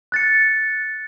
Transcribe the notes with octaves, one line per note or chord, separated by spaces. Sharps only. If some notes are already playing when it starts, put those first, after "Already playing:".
F#6 A6 C#7